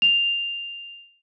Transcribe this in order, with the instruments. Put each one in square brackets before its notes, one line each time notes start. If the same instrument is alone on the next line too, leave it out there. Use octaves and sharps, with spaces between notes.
[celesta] F7